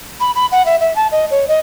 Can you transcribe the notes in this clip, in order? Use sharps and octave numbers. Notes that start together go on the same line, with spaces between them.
B5
B5
F#5
E5
E5
A5
D#5
C#5
D#5